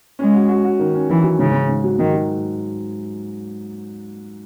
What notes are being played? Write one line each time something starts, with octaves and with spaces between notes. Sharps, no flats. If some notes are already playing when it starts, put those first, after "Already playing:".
G#3 C#4
F#4
F#4
F#4
D#3
C#4
E3 F#3
F#3
G#2 C#3
G#2
G#2
F#3
G#2 D#3
F#3